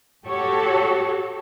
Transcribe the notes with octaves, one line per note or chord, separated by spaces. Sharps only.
F#4 G4 A4 C#5